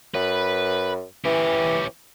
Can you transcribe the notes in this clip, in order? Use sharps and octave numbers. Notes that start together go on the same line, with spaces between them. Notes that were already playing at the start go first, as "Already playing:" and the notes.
F#2 B4
E3 C#4 G4